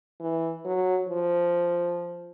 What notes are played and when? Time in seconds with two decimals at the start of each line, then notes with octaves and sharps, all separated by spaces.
0.21 E3
0.65 F#3
1.09 F3